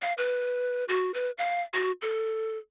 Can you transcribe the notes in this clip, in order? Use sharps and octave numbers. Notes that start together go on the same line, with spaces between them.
F5
B4
F#4
B4
F5
F#4
A4